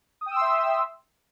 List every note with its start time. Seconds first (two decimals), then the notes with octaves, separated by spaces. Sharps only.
0.21 D#6
0.26 G5
0.31 E6
0.36 C6
0.41 E5